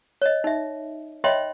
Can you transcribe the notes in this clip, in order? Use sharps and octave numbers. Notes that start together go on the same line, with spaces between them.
C#5 D#5
D#4 E5
C#5 D#5 E5 G5 B5 C6